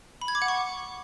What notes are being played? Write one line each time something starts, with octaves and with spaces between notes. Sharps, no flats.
B5
G#6
D6
F#5
C#6